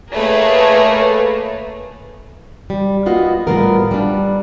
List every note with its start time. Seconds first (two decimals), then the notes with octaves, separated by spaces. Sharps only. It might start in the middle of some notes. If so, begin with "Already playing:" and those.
0.14 A3 A#3 G#4 A#4 B4 C#5
2.70 G3
3.06 A#3 B3 F4 F#4 D#5
3.47 A2 G3 G#3 B3 F4 A#4
3.91 G3 D4